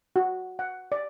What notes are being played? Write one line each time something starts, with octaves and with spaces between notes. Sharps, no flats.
F#4
F#5
D5